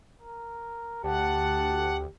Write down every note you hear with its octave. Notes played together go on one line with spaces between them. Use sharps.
A#4
D2 G4 F#5 A5